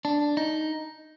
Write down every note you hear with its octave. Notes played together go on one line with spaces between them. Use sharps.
D4
D#4